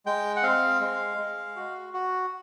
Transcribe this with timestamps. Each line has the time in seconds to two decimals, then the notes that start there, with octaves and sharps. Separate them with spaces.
0.06 G#3 G5
0.36 F#5
0.43 C4 F5
0.80 G#3
1.18 G#3
1.56 F#4
1.93 F#4